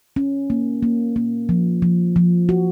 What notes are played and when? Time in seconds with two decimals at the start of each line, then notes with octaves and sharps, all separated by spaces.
0.16 C#4
0.50 A#3
0.83 A#3
1.16 A#3
1.49 F3
1.82 F3
2.16 F3
2.49 F#4